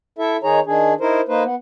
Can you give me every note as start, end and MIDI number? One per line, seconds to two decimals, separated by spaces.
0.19 0.37 64
0.19 0.37 69
0.19 0.37 76
0.43 0.60 51
0.43 0.60 63
0.43 0.60 68
0.43 0.60 73
0.43 0.60 82
0.67 0.93 51
0.67 0.93 62
0.67 0.93 68
1.00 1.21 63
1.00 1.21 64
1.00 1.21 70
1.00 1.21 72
1.29 1.43 58
1.29 1.43 63
1.29 1.43 71
1.29 1.43 72
1.44 1.55 59